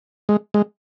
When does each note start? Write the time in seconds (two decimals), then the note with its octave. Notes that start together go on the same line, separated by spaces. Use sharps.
0.29 G#3
0.54 G#3